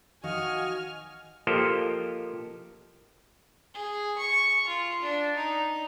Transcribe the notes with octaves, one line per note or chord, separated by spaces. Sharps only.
D#3 F#4 D#5 F5 G#5 C#6 F6
F3 A#3 G4 A4 C5 D#5
G#4
C#6
F4
D4
D#4